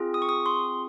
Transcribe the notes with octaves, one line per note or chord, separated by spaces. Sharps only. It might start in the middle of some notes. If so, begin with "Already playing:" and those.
Already playing: C4 F4 G#4
D#6
C#6
D#6
C6